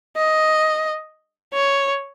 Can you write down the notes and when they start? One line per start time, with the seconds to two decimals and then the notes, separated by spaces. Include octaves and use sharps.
0.17 D#5
1.54 C#5